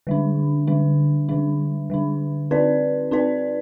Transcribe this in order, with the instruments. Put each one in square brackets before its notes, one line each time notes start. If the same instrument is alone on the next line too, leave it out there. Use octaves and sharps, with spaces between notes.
[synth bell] D3 G3 D4
D3 G3 D4
D3 G3 D4
D3 G3 D4
C4 D#4 B4 D5
C4 D#4 B4 D5